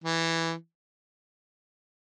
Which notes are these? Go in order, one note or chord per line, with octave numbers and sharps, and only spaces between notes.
E3